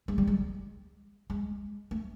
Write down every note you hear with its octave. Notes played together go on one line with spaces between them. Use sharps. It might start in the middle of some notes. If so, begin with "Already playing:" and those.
G#3
G3
G#3
G#3
A3